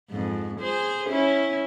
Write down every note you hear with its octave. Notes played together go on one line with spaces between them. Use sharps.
F2 G#2
G#4 C5
C#4 E4